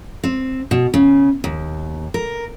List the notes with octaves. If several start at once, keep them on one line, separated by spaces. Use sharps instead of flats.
C4
B2
C#3
D#2
A#4